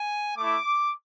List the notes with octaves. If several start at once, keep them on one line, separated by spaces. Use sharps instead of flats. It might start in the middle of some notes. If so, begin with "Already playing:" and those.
Already playing: G#5
A3 E4 D6